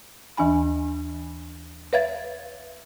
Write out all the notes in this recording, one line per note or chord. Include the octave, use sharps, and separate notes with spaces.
D#2 E3 D4 G#5 B5
B4 C#5 E5 F5 G#6 A6